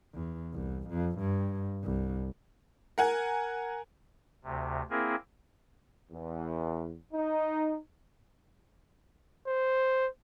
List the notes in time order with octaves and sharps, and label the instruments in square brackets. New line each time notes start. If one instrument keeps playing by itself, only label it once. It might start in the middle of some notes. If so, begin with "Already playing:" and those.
[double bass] E2
C2
F2
G2
C2
[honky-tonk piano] A#4 F#5 G#5
[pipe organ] D2 C3
A#3 C4 E4 G#4 A#4
[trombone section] E2
D#4
[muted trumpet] C5